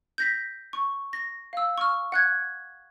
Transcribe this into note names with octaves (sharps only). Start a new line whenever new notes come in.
G6 A#6 B6
C#6
A#6
F5 E6
C#6 F6
F#5 F#6 G#6